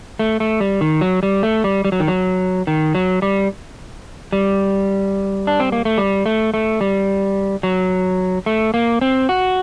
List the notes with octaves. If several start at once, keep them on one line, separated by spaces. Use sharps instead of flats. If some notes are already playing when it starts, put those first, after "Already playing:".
A3
A3
G3
D#3
F#3
G3
A3
G3
G3
F#3
D#3
F#3
D#3
F#3
G3
G3
D4
C4
A#3
A3
G3
A3
A3
G3
F#3
A3
A#3
C4
F#4